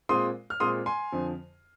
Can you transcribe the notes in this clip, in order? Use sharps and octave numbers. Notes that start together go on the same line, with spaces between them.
A#2 G#3 C4 F4 C6 D#6
F6
A#2 G#3 C4 F4 C6 D#6
G#5 C6
F2 D3 F3